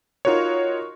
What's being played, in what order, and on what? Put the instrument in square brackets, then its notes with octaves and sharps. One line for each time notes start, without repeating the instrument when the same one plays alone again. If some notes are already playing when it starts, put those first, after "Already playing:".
[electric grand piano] D#4 F4 F#4 A#4 C#5